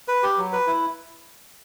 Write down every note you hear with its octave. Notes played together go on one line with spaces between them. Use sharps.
B4
G4
F#3
B4
E4